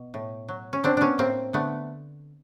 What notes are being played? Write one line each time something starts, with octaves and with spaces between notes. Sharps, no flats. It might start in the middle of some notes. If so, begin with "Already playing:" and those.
Already playing: B2
A2
F#3
C#4
F#3 C4 D4
B3 C#4 D4
A2 A#3 C4
D3 A3 B3